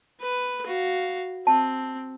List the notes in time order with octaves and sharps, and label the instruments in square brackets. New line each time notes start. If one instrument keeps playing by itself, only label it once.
[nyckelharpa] B4
F#4 F5
[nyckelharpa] C4 [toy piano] A5